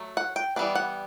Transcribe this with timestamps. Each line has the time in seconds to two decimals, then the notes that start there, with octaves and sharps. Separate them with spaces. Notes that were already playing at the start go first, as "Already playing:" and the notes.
Already playing: F#3 A3
0.17 F#5
0.36 G5
0.56 E3 G3 B3 D4
0.75 F#5